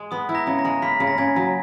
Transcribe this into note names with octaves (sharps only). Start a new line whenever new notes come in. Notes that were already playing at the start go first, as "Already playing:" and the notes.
Already playing: G#3
B3 D#6
E4
A#5 A#6
C#3
A#5 A#6
G#3
A#3 B5 B6
C#3
A#6
C#3 G#5 G#6
F#3